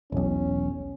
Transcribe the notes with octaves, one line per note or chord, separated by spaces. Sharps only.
E1 B1 C#4